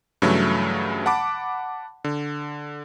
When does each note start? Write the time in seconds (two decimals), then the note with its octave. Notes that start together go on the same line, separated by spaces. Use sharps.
0.22 G2 C#3 E3 F#3 A3
1.06 F#5 A5 B5 D6
2.04 D3